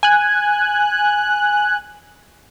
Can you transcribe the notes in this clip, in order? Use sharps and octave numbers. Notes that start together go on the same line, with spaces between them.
G#5 F#6